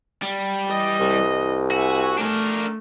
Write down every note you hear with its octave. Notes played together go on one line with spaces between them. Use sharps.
G3
E3 D#5
C2
F#4 E5 G#5
A3 D4 A#4